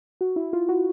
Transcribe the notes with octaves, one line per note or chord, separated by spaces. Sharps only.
F#4
E4
F4
F#4